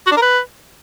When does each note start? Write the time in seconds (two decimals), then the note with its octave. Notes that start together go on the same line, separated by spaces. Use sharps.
0.07 F#4
0.12 D4
0.17 A#4
0.22 B4